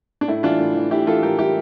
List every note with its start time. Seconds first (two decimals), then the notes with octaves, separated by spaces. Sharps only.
0.21 D4
0.28 A2 E4
0.43 E3 D4 F4
0.59 A2
0.75 E3
0.91 A2 E4 G4
1.07 E3 F4 A4
1.23 A2 G4 A#4
1.38 E3 E4 G4